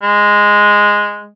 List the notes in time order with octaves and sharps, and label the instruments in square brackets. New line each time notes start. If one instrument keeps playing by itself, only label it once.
[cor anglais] G#3